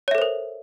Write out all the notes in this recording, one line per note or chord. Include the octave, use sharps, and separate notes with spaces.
A4 A#4 C5 C#5 E5